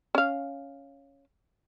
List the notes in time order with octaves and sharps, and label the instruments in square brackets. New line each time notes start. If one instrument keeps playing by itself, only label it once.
[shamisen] C#4 F5